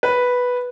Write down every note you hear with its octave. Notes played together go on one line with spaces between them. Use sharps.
B4